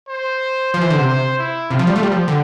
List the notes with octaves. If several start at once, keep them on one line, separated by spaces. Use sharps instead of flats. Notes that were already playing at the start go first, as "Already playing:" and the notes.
C5
F3 C5
E3
D3
C3
C5
E4
C3 F4
F3
G3
A3
G3 G4
F3
D3